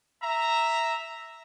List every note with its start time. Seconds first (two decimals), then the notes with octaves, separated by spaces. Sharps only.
0.23 E5 A#5